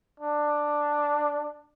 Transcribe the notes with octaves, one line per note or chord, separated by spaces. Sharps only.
D4